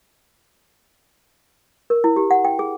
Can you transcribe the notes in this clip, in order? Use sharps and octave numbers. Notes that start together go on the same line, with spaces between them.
A#4
E4
G4
F#5
G5
G#4